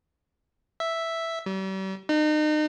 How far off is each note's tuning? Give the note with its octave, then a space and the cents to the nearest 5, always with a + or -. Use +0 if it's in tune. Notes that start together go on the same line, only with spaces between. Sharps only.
E5 +0
G3 -40
D#4 -35